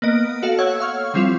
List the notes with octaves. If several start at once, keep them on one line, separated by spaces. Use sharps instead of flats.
A#3 B3 D#5 D7
F#4 A4 F5
C#5 F#5 E6 G#6
F5 C#6 F6
F3 G3 C4 E4 F4